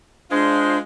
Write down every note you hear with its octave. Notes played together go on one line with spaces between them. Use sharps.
G#3 D4 F4 C5